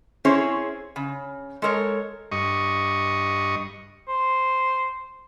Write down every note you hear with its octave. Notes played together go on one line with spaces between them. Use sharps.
C4 C#4 E4 G#4 C5 C#5
C#3
G#3 A4 A#4 C#5
G2 D#5 C#6
C5